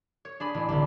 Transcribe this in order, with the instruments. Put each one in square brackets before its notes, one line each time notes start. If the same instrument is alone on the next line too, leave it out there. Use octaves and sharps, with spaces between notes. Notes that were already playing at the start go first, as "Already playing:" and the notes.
[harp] C#5
D4 G#4 B5
A1
C2 D3